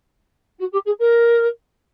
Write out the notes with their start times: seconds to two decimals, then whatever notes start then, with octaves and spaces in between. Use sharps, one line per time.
0.59 F#4
0.72 G4
0.85 G#4
0.99 A#4